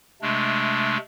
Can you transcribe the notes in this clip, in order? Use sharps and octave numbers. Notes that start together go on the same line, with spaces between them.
C3 G#3 A3 D4